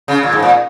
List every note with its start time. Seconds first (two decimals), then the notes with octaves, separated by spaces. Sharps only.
0.08 C#3
0.23 A#2
0.33 G#2
0.42 A#2